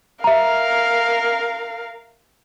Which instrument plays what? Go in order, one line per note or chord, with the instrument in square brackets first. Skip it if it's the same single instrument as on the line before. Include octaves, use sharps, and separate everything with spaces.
[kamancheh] A#4 F5 [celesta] E5 A#5